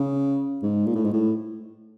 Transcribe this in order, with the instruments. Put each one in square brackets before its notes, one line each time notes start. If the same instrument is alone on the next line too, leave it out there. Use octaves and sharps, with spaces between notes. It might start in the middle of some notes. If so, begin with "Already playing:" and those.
Already playing: [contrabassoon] C#3
G#2
A#2
A2
G#2
A2